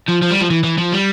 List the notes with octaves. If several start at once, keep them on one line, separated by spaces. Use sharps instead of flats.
F3
F3
G3
F3
E3
E3
F3
G3